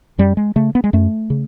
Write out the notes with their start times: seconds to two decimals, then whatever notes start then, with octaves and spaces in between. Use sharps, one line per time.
0.18 F#2 G3
0.37 G#3
0.56 C#3 A3
0.75 B3
0.84 G#3
0.93 F#2 A3
1.30 C#3